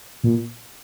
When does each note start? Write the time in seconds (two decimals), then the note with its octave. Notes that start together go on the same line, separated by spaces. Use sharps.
0.24 A#2